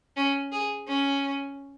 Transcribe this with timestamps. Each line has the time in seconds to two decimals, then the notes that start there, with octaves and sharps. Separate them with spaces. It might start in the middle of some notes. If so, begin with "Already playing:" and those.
0.17 C#4
0.52 G#4
0.88 C#4